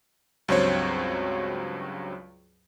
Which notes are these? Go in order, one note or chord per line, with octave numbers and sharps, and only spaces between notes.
C#2 G2 F#3 C4 C5 C#5